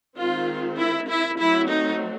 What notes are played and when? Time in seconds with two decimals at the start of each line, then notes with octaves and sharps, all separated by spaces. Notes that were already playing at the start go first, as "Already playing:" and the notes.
0.17 D#3 G#3 C4 F4
0.78 E4
1.09 E4
1.39 F#3 A3 C4 E4
1.70 D#4